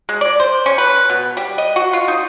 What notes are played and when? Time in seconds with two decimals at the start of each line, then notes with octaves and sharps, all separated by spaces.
0.09 G#3
0.21 D5
0.40 C5
0.66 C#4
0.78 B4
1.10 B2
1.37 G3
1.58 D#5
1.76 F#4
1.93 F4
2.08 D#4